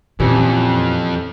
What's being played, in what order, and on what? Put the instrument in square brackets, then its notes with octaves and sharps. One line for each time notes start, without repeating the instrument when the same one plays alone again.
[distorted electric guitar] F2 [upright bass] A#2 [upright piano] E3 G3 C#4